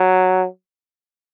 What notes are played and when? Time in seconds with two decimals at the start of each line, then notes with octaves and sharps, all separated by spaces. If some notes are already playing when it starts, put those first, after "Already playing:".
Already playing: F#3